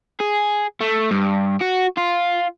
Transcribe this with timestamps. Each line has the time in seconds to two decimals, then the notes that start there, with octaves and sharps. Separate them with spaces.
0.20 G#4
0.81 A3
1.11 G2
1.61 F#4
1.97 F4